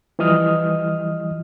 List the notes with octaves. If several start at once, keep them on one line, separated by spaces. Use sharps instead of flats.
E3 F3 G3 D#5 D#6 F6